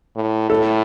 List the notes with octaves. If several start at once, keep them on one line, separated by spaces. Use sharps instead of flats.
A2
A2 A4